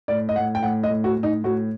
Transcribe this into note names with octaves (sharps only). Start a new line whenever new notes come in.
A2 D5
D#5
A2 F#5
G5
A2 F#5
D#5
A2
F#4
A2
D#4
A2 F#4